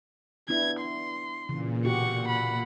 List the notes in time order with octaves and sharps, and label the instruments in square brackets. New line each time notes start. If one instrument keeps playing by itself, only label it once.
[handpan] B3 D4 E4 [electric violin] G#6
[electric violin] C6
[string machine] A#2 [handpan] C#3 E3
[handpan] B2 F#4 G4 [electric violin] F#5 C#6
[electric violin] F#5 B5